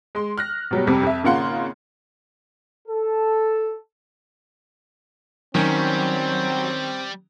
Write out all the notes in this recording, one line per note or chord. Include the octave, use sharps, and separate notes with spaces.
G#3 C6
F6 F#6 A#6
B2 F#3 G3
F2 C3 G3
F2 E5
G#1 C#3 A#3 F4 F#5 C6
A4
D#3 F#3 G3 C4 C#4